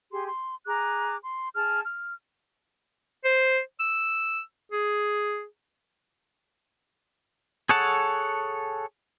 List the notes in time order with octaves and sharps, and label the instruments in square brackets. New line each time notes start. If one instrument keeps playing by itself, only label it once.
[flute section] G4 G#4 C6
C6
G#4 A#5 D6 F#6
C6
G#4 A5 F6
F6
[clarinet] C5
E6
G#4
[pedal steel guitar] G#4 A4 C#5 F#5 A5